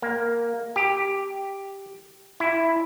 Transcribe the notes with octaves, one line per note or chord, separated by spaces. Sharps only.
A#3
G4
E4